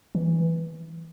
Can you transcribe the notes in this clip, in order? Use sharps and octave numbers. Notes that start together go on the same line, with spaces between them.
E3